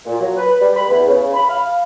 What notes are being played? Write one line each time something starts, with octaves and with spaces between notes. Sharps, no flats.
A#2
F#3
B4
G3
B5
E2
C#3
B5
F5